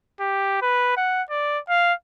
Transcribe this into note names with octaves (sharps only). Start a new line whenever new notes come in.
G4
B4
F#5
D5
F5